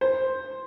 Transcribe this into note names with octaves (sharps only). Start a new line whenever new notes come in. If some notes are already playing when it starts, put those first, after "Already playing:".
C5